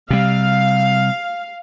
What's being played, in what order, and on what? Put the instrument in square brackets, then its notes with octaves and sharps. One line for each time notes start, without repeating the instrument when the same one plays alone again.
[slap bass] C3 G3 [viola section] F5